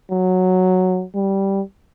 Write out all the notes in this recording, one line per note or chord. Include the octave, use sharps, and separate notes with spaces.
F#3
G3